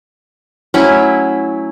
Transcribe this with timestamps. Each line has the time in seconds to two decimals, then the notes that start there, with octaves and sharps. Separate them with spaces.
0.74 F#3 A3 C#4 E4